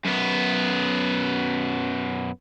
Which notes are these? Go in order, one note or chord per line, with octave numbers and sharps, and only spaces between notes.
F#2 B3